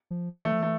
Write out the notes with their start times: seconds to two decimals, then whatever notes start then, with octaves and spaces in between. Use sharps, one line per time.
0.11 F3
0.45 E3 A3
0.52 F3
0.60 E3 A3